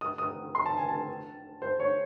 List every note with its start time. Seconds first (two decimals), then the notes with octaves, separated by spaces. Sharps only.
0.01 D#6
0.18 D#6
0.55 C6
0.66 A5
0.77 G#5
0.89 A5
1.62 C5
1.80 C#5